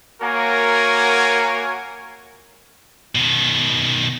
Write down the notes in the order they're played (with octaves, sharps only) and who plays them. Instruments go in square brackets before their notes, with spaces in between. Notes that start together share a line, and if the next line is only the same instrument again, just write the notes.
[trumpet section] A#3 F#4 A#4 C#5 G#5
[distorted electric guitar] B2 D#3